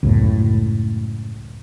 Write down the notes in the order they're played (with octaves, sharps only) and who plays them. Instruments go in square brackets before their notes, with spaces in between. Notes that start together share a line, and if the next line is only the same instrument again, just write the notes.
[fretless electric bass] C#2 F#2 A2